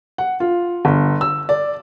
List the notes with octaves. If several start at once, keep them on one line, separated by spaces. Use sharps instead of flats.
F#5
F4
G1
E6
D5